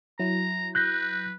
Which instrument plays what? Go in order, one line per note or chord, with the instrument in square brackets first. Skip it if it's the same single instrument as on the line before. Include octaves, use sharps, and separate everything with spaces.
[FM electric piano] F#3 E4 [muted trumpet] A#5
[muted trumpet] B4 [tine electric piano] F#6 G6 A#6